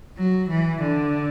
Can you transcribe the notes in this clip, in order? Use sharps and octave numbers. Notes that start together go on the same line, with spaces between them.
F#3
E3
D3